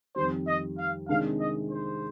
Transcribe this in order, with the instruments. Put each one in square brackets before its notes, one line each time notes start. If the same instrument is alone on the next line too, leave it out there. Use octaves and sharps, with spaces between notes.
[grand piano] F2 D#3 G3 [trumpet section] C5
[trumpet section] D#5
F5
[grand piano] C3 D#3 G#3 D4 [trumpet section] F5
[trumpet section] D#5
C5